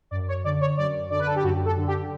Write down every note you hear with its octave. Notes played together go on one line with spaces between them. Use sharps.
F#2 D5
C#5
D3 D5
C#5
F#2 D5
D3 D5
B4
A4
G4
F#2 F#4
A4
D3
G4